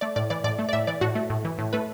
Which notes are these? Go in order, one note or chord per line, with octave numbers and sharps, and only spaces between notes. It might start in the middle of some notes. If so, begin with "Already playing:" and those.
A3 D5
A2 D5
E3 D5
A2 D5
A3
D5
A2 E5
E3 D5
A2 F#4
A3
A2
E3
A2
A3 B4